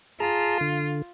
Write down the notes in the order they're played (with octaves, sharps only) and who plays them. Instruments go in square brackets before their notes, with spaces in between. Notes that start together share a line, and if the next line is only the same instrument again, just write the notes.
[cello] F4 [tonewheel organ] G#4 A5 A#5
[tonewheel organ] D3